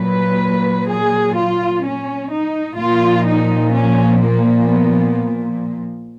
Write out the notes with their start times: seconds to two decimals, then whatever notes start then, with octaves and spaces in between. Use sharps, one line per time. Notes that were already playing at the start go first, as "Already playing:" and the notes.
Already playing: A#2 F#3 B4
0.88 G#4
1.35 F4
1.83 C#4
2.30 D#4
2.77 A#2 F3 F4
3.24 D#4
3.71 C#4
4.18 A#3
4.66 B3